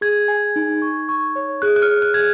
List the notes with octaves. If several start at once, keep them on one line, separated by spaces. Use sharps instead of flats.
G#4 G#6
G#5
D#4
C#6
C#6
C#5
G#4 F#6
F#6
F6
G#4
F#6
G#4 G#6